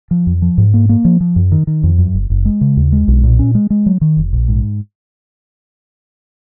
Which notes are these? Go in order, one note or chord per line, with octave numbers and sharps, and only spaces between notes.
F3
F2
F3
G#2
A#3
A#3
F3
F3
F#2
D#3
D#3
F2
F#2
F#1
F#1
G#3
C#3
D#2
G#3
B1
A#2
C#4
G#3
G#3
F#3
D#3
F1
A#1
G#2